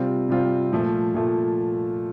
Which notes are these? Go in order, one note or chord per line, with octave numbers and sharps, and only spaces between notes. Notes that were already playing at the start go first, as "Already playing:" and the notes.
Already playing: C3 G3 C4 F4
C3 G3 C4 F4
A#2 F3 A3
A#2 F3 A3